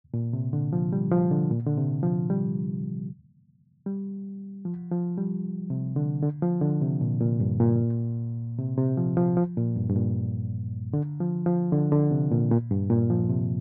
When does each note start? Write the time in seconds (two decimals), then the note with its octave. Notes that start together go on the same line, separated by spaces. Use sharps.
0.14 A#2
0.33 C3
0.53 D3
0.73 F3
0.93 G3
1.11 F3
1.31 D3
1.51 A#2
1.67 D3
1.77 C3
2.03 F3
2.30 G3
3.87 G3
4.65 F3
4.92 F3
5.17 G3
5.70 C3
5.96 D3
6.22 D3
6.42 F3
6.61 D3
6.81 C3
7.01 A#2
7.20 A#2
7.40 G2
7.60 A#2
8.58 C3
8.78 C3
8.97 F3
9.17 F3
9.37 F3
9.57 A#2
9.76 G2
9.90 G2
9.95 A#2
10.93 D3
11.20 F3
11.46 F3
11.72 D3
11.92 D3
12.11 C3
12.31 A#2
12.51 A#2
12.71 G2
12.90 A#2
13.10 F3
13.29 C3